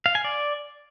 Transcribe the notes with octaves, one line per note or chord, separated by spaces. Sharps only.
F5
G#5
D5